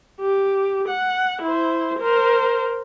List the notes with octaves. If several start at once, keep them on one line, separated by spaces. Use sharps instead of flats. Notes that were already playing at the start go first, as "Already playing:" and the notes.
G4
F#5
E4 C5
A#4 C5